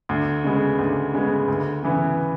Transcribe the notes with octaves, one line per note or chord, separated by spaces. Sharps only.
D2
C#3 G#3 B3
D2
C#3 G#3 B3
D2
C#3 E3 B3